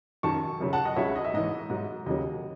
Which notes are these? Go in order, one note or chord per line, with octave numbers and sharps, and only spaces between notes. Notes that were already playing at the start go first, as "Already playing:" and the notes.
F#2 D#3 F#3 A5 C#6
F#2 C#3 F#3
F#5 A5
D#5 F#5
C#2 C#3 F#3 C#5 E5
D#5
E5
G#2 E3 D#5
G#2 F#3
D#2 C#3 F#3 D#5